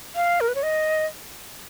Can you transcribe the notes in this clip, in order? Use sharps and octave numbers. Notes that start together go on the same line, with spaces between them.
F5
A#4
B4
C#5
D#5